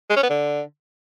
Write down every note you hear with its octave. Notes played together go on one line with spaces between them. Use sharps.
G#3
C#4
B3
D3